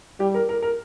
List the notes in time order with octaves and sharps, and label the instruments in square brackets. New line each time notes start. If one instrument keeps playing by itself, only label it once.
[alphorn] G3 [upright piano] G4
[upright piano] A#4
A#4
A#4